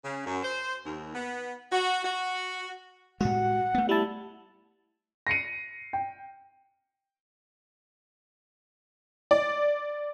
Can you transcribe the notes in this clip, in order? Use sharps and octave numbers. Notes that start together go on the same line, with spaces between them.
C#3
F#2
C5
D#2
B3
F#4
F#4
A2 G3 G#3 F#4 F#5
A3 B3
G3 E4 A5
A#6 C7 C#7 D#7
G5
D5